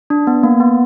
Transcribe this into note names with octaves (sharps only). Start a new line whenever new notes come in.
D4
B3
A#3
B3